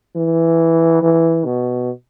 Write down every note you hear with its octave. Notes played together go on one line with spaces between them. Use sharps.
E3
E3
B2